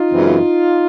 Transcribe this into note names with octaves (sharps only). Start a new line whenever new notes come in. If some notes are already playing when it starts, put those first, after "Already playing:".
Already playing: D#4 F4
F#2 C#3 E3 G#3 C4